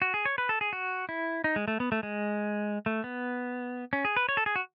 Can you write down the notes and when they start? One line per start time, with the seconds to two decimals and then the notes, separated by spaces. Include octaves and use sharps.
0.02 F#4
0.14 G#4
0.25 C#5
0.38 B4
0.49 A4
0.61 G#4
0.73 F#4
1.09 E4
1.44 D#4
1.56 G#3
1.68 A3
1.80 B3
1.92 A3
2.03 G#3
2.86 A3
3.04 B3
3.93 C#4
4.05 G#4
4.17 B4
4.29 C#5
4.37 A4
4.46 G#4
4.56 F#4